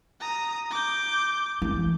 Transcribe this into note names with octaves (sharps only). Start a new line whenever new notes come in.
A#5 D#6
D6 G6
E3